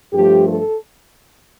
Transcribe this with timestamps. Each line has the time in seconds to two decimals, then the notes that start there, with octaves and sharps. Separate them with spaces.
0.13 G2 F3 A3 G4
0.47 A4